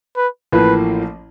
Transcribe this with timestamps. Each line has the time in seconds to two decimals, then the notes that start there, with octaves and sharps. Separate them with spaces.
0.17 B4
0.52 A1 A2 F3 A#3 B4